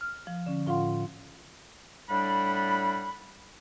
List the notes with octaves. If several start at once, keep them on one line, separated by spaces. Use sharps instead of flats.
F6
F3
D3 C#4
A2 F4 F5 F#5 C6
A2 G3 D4 F#5 B5